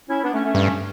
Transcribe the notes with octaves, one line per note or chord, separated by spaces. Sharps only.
C#4 E4
B3 D4
A3 C#4
A3 C#4
G2